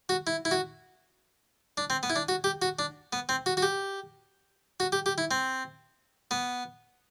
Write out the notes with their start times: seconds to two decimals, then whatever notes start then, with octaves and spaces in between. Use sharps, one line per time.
0.09 F#4
0.27 E4
0.45 E4
0.51 F#4
1.77 D4
1.90 C4
2.03 B3
2.10 E4
2.16 D4
2.29 F#4
2.44 G4
2.62 F#4
2.79 D4
3.13 B3
3.29 C4
3.46 F#4
3.57 F#4
3.62 G4
4.80 F#4
4.92 G4
5.06 G4
5.18 E4
5.31 C4
6.31 B3